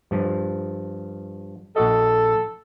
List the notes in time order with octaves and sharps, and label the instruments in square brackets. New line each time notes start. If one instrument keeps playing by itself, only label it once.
[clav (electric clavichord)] G2 F3
[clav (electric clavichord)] A#1 F#4 D#5 [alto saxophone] A4